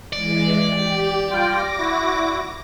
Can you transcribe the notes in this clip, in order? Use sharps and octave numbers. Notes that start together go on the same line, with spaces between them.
E3 G#3 D5
G4
G3 F4 G5 D6 A#6
E4 F#4